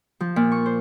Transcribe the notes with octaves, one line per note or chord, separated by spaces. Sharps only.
F3
A#2
C#6
C5